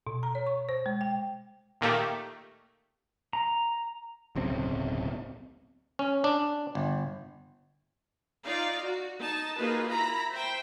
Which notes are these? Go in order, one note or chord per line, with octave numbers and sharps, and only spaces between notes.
B2
A#5
C#5
C#6
C5
G#3
G5
A#2 D#3 A3 A#3 G4
A#5
D1 B1 C#3 C4
C#4
D4
G1
D#4 F4 D5 F5
F#4
D#4 A5
A#3 D#4 F4 F#4 G#4 B4
E4 A#5 B5
C5 E5 G5